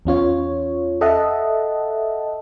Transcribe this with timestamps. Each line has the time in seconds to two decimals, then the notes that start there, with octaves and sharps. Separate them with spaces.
0.05 E2 C#4 F4 C#5
1.01 A4 D#5 E5 F#5 A5